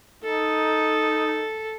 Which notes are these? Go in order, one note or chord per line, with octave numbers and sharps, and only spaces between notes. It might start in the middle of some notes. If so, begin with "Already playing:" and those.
D#4 A4